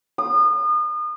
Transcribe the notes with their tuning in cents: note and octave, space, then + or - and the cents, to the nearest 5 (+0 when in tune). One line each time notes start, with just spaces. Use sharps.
D#6 -35